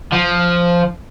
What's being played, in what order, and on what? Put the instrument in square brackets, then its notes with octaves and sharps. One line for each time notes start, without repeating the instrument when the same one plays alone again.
[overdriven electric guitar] F3